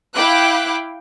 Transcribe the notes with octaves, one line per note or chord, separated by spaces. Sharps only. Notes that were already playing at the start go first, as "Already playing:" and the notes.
E4 F5 G5 D6 F#6